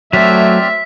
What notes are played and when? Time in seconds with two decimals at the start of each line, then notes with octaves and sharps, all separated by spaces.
0.13 F#3 A3 C4 D5 E5 F6 B6